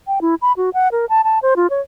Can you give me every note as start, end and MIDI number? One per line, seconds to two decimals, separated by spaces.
0.07 0.19 79
0.22 0.35 64
0.42 0.52 83
0.57 0.70 66
0.74 0.88 78
0.92 1.05 70
1.09 1.22 81
1.24 1.39 81
1.43 1.54 72
1.56 1.67 65
1.70 1.81 73